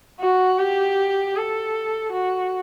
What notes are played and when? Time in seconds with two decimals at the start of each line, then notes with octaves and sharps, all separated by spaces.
0.20 F#4
0.59 G4
1.36 A4
2.12 F#4